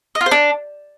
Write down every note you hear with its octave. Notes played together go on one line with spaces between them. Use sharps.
D#5
F4
C5
D4